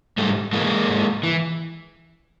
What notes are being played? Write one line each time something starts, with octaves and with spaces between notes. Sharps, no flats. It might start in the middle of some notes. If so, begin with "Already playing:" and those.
G#2 G3 A3
E3 G#3 A#3
G#2
E3